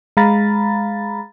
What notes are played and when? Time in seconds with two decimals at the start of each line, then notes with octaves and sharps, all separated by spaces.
0.17 G#3 F5 A#5 B5 A6